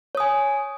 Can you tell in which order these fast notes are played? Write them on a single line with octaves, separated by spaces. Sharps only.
C#5 D#6 G#5